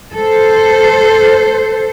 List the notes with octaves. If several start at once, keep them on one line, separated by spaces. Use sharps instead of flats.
A4 C5